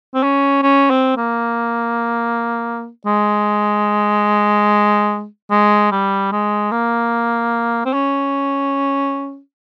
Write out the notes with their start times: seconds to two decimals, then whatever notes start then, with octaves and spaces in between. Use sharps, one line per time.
0.15 C4
0.23 C#4
0.63 C#4
0.90 C4
1.17 A#3
3.06 G#3
5.51 G#3
5.92 G3
6.32 G#3
6.72 A#3
7.86 C4
7.94 C#4